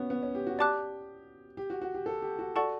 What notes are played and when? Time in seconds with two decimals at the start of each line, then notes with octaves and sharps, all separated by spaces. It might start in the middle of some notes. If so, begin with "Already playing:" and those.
Already playing: B3 C#4 F#4
0.10 B3
0.23 C#4
0.35 G4
0.47 F#4
0.59 G4 D5 A5 D6 F#6
1.57 G4
1.70 F#4
1.82 F#4
1.94 G4
2.06 A4
2.22 G4
2.39 F#4
2.56 F#4 A4 D5 F#5 A5 C#6